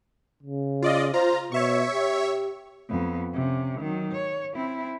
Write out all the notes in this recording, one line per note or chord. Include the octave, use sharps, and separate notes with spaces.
C#3
F4 D5 D#5
F4 C5 A#5
B2 C#5 E5 C#6
G4
F2 B3
C3 C#4
D#3 F#3
C#5
C4 E4